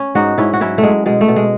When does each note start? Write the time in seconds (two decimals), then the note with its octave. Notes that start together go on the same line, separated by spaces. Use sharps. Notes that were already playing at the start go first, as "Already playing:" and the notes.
Already playing: C#4
0.15 G#2 D#4 F#4
0.38 G#2 C#4 E4
0.53 F#4
0.60 F#3 C#4 E4
0.78 A3
0.83 F#3 G#3
1.06 B2 G#3
1.21 A3
1.28 B2
1.36 G#3